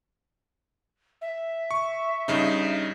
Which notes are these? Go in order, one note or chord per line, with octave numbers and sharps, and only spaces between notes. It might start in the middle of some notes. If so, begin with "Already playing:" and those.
E5
C#6
G2 C#3 D#4